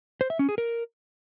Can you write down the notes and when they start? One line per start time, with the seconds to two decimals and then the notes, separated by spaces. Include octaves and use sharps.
0.21 C5
0.30 E5
0.39 C#4
0.49 G#4
0.58 A#4